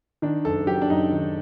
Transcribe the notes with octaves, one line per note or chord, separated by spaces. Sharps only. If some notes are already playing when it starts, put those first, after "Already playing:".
D#3 D4
F#1 A4
F#3 G4
D4
F#2 D#4
D#3